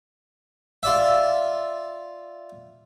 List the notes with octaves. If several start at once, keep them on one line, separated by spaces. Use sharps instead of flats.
F4 D5 E5